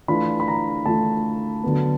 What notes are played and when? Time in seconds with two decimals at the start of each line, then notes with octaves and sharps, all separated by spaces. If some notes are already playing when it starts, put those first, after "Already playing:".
0.08 E3 A3 D4 F4 B5
0.40 B5
0.48 A#5
0.86 E3 A3 D4 F4 A5
1.63 D3 F#3 B3